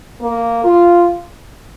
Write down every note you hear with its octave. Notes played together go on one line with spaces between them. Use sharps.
A#3
F4